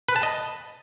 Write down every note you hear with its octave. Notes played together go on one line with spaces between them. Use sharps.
B4
A5
D#5